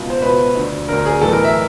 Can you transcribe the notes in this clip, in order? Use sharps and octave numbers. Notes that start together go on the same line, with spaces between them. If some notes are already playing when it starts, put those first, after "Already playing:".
Already playing: C#2 B2
C5
C#2 B2 B4
D2 D3
D2 D3 A#4
G#4
B1 A2 E3 A4
A#4
E5